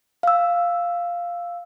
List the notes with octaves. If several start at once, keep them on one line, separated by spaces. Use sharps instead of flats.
F5 E6